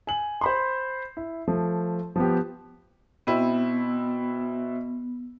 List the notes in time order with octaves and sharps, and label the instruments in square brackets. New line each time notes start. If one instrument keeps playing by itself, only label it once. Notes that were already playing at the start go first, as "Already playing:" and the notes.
[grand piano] G#5 F#7
C5 B5 C6
E4
F3 A3
F3 B3 G4
[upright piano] B2 C4 E4 [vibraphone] B3